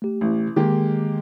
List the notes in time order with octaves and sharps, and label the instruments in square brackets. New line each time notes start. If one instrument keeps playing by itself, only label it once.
[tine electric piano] A3 G4
[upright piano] A1
[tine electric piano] D#3 [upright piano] G#3 A#3 G4